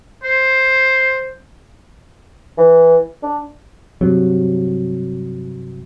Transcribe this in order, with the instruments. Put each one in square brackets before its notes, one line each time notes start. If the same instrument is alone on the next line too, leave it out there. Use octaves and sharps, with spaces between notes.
[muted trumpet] C5
[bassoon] E3
D4
[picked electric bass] G2 C3 F#3